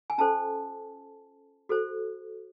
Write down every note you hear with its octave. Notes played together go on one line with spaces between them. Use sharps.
G#5
C#4 F4 A4 C5 A5
F#4 A4 C5